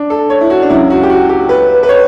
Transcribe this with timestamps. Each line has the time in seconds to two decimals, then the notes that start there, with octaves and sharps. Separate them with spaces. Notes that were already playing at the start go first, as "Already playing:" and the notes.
Already playing: D4
0.10 A4
0.30 C#5
0.41 E4
0.50 F#4
0.62 D4
0.70 C#2 C#3 F#3 E4
0.90 F#4
1.03 G4
1.10 F#4
1.29 G4
1.49 B4
1.83 B4
1.89 C#5